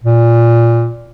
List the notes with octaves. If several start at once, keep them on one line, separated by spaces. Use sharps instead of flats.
A#2